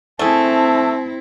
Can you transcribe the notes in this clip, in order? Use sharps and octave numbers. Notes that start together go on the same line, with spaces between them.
A3 C4 E4 G#4 A5